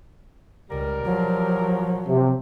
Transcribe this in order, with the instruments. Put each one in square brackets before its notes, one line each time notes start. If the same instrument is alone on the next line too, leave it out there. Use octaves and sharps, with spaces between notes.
[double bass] C#2 [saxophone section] G3 A#4
[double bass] F3 F#3
[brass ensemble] C3